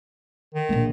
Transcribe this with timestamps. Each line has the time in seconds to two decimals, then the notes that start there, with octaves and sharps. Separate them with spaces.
0.55 D#3
0.69 A#1 A#3